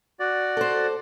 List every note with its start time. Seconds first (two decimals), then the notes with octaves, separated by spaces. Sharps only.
0.20 F#4 D5
0.57 A4 C5